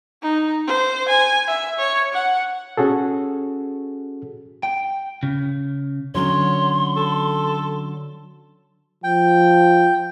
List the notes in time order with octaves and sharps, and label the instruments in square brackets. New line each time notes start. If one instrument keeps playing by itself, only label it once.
[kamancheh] D#4
C5
G#5
E5
C#5
F#5
[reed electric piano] C#4 F#4 G#4 A4
[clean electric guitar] G5
C#3
[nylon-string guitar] D3 F#3 C#4 [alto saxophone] C#5 [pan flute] C6
[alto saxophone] A4
[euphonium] F3 [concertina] G5